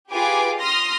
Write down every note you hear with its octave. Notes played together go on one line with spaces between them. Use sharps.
F4 G4 G#4 B4 G#5 D6
C6 D#6 F6 A#6